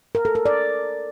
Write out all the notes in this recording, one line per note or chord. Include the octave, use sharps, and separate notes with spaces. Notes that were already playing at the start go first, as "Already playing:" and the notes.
A#4
A4
A#4
D5